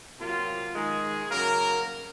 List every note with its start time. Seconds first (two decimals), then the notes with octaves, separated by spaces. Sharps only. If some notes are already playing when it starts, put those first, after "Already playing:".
0.19 C3 F#3 A#3 F4
0.75 D#3 G#3 G#4
1.30 C#3 F#3 A#3 A#4